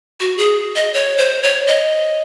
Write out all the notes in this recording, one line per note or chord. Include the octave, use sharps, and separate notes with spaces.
F#4
G#4
D#5
C#5
C5
C#5
D#5